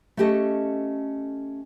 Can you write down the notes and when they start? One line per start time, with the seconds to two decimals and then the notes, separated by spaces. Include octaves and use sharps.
0.17 A3 C#4 G4 A4 D#5